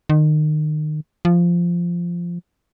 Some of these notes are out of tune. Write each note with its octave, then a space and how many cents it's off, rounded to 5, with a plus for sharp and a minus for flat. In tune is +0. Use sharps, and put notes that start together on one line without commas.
D#3 -30
F3 -10